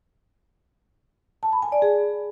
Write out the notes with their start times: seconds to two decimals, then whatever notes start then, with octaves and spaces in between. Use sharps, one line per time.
1.43 A5
1.53 B5
1.62 G#5
1.72 D5
1.82 G#4